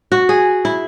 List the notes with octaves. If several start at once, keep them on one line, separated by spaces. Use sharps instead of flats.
F#4
G#4
E4